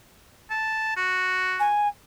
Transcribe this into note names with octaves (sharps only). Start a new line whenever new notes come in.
A5
F#4
G#5